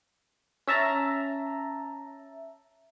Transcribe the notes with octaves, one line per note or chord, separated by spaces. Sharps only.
C#4 E5 A5 A#5